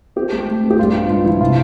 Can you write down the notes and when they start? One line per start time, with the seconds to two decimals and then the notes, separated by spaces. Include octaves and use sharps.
0.16 C4 G4
0.32 A3
0.48 A3
0.63 C4
0.71 G4
0.79 G2 F4
0.94 B3 F4
1.10 G2 F4
1.25 F3 E4
1.41 C3 F4